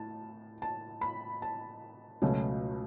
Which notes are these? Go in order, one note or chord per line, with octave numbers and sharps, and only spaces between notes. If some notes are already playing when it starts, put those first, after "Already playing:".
Already playing: A2 A5
A5
B5
A5
C#2 B2 F#3 A3 C#4